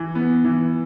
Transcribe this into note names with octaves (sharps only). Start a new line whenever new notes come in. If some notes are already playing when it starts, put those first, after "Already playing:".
Already playing: E3
B3
E3